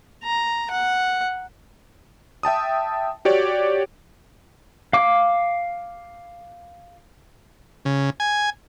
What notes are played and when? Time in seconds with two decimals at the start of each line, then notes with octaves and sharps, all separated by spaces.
0.24 A#5
0.71 F#5
2.43 E5 G5 A5 D#6
3.25 F#4 G4 C#5 D5
4.93 F5 D6
7.85 C#3
8.20 G#5